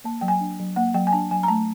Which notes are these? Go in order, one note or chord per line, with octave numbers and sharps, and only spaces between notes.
A#3 A5
F#3 G5
G#5
D4
F#3
A#3 F#5
F#3 G5
G#5
D4 A5
F#3 G#5
A#5
A3 A5